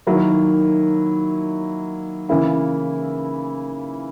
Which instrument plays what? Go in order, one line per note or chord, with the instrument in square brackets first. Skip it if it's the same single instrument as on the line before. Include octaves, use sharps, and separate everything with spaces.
[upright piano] D#3 F#3 A#3 E4
C#3 E3 A#3 E4